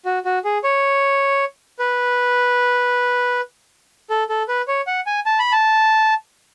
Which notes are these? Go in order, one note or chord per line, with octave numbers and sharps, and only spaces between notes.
F#4
F#4
G#4
C#5
B4
A4
A4
B4
C#5
F#5
G#5
A5
B5
A5